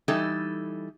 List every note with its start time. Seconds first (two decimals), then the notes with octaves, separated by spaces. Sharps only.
0.08 E3 G3 D#4 A4